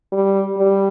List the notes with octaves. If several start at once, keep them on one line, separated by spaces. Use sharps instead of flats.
G3
G3